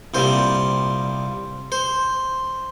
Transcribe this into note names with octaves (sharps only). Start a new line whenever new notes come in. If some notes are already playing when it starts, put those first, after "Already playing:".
C2 A#2 G3 C5
C5